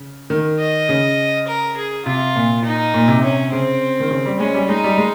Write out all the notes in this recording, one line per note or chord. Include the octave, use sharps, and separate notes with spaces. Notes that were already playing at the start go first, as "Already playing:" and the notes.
Already playing: C#3
D#3
D#5
C#3
A#4
G#4
C3 F4
A#2
D#4
A#2
C3
C#4
C#3 C4
D#3
C#3
G3
G#3 C#4
G3
G#3 D#4
G3
G#3